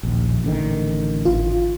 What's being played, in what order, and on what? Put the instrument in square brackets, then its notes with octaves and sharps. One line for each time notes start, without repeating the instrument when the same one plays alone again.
[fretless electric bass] A#1 D#2
A1 D3 D#3
[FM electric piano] G#1 F4